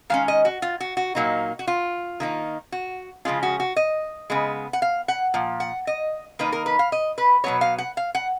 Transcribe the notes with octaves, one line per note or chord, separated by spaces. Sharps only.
D#3 G#3 C#4 F5
D#5
F#4
F4
F#4
F#4
A#2 F#3 A#3 D#4
F#4
F4
D#3 A#3 D#4
F#4
C#3 F3 G#3 C#4 F4
F#4
F#4
D#5
C#3 G#3 B3
F#5
F5
F#5
A#2 F3
F#5
D#5
D#3 A#3 D#4 B4
A#4
B4
F5
D#5
B4
B2 F#3 B3 C#5
F5
F#5
F5
F#5